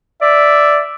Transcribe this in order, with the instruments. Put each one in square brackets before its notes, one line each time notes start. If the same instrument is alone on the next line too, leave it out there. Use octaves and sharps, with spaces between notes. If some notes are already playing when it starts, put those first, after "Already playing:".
[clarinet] D5 [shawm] E5